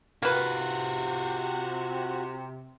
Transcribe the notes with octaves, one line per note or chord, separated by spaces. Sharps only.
C3 A#3 F4 F#4 B4